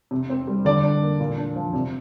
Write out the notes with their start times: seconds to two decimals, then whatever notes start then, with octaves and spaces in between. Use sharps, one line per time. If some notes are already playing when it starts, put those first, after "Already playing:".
0.11 C3
0.30 C4
0.47 G3
0.65 D3 D5
0.84 D4
1.02 A#3
1.20 A#2
1.38 D4
1.56 F3
1.73 C3